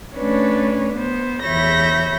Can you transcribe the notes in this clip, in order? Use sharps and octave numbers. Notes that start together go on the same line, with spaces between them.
A3 C#4 D4 B4 C#5
B3 C5
E2 C#5 E5 B5 G6 A#6